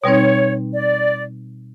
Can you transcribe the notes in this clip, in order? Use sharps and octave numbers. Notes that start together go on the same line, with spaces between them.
B2 G3 C4 D#4 C#5
D5